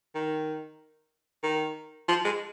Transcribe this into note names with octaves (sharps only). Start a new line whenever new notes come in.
D#3
D#3
F3
G#3